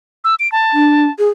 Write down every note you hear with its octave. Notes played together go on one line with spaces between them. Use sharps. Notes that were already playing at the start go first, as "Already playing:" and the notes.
E6
D7
A5
D4
G#4